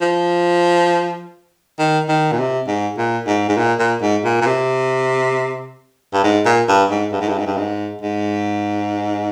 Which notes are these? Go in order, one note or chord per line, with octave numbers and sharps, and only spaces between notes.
F3
D#3
D#3
A#2
C3
G#2
A#2
G#2
G#2
A#2
A#2
G#2
A#2
A#2
C3
G2
G#2
A#2
G2
G#2
G2
G#2
G2
G#2
G2
G#2
G#2